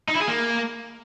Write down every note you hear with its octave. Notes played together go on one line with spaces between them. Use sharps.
D#4
E4
G#4
A#3